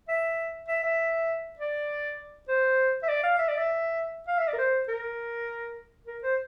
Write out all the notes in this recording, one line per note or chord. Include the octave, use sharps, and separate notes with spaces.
E5
E5
E5
D5
C5
E5
D5
F5
E5
D5
E5
F5
E5
D5
A#4
C5
A#4
A#4
C5